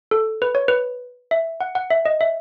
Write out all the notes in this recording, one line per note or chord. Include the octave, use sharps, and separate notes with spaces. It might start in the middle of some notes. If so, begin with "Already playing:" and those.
A4
B4
C#5
B4
E5
F#5
F#5
E5
D#5
E5